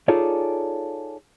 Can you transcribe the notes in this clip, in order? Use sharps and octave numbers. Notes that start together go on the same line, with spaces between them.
D#4 F4 G#4 A4 C#5 D5